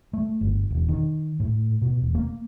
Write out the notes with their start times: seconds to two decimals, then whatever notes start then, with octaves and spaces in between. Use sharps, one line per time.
0.13 A3
0.41 G1
0.70 E1
0.89 D#3
1.40 A2
1.82 B2
2.02 E1
2.15 A#3